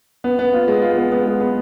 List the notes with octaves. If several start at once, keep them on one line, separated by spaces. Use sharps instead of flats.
B3
B3
F4
G#3
F4
B3
B3
G#3
B3